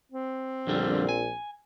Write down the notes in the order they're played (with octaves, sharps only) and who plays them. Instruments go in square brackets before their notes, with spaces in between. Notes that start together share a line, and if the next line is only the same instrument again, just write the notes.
[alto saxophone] C4
[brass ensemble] A#1 A#2 [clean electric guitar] F2 D3 G3
[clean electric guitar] G#5